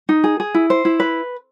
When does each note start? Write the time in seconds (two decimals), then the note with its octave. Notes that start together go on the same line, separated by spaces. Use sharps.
0.09 D#4
0.24 G#4
0.40 G#4
0.54 E4
0.70 C5
0.85 E4
1.00 B4